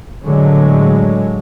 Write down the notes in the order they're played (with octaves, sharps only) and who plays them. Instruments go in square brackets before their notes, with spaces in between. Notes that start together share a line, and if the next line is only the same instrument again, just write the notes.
[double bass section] A2 D3 F#3 G#3